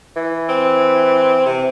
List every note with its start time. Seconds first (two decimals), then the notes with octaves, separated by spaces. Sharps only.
0.16 E3
0.49 C4
1.46 C3